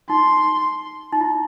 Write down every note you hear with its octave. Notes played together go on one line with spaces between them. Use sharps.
D#4 C6
D#4
E4